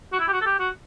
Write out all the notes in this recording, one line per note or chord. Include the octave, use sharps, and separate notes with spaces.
F#4
E4
G4
F#4
A4
G4
F#4